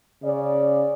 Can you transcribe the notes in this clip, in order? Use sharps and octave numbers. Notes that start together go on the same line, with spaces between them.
C#3 D5